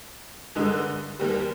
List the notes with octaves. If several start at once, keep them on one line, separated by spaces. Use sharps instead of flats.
G#1 G2 D3 G#3 D#4
D#2 D#3 G3